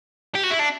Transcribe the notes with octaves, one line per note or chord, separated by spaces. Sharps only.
G4
F#4
E4
D4